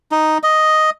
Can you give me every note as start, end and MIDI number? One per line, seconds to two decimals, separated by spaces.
0.12 0.38 63
0.43 0.90 75